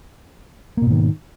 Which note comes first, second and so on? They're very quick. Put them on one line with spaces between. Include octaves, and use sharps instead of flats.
A#3 B2 G#2 D#3